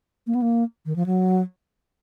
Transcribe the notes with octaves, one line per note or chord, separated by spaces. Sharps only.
A#3
B3
A#3
D#3
F3
F#3